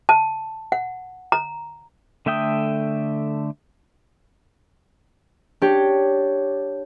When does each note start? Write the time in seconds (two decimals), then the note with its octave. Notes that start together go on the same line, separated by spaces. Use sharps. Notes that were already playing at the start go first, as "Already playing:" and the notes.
0.09 A5
0.72 F#5
1.32 A#5
2.26 D3 A3 E5 G5 D#6
5.61 D4 G4 C#5